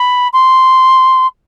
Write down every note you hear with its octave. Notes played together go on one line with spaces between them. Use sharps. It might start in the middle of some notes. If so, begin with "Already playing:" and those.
Already playing: B5
C6